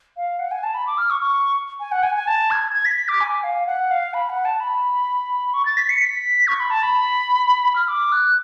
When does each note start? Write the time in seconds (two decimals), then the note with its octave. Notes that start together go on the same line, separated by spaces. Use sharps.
0.17 F5
0.39 F#5
0.51 G#5
0.63 A5
0.74 B5
0.87 D6
0.98 F6
1.10 C#6
1.21 C#6
1.80 G#5
1.92 F#5
2.03 G#5
2.15 G#5
2.27 A5
2.51 G#6
2.74 G#6
2.85 B6
2.97 B6
3.08 D6
3.21 G#5
3.44 F5
3.67 F#5
3.91 F5
4.14 B5
4.30 F#5
4.45 A5
4.60 B5
5.54 C#6
5.65 A6
5.77 B6
5.90 C#7
6.01 B6
6.48 C#6
6.60 B5
6.70 A5
6.83 B5
7.76 F6
7.88 D6
8.12 F#6